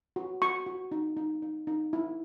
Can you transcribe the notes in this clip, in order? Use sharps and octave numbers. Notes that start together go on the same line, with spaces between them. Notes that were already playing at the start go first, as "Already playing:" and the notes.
F#4
F#4 C#6
F#4
D#4
D#4
D#4
D#4
E4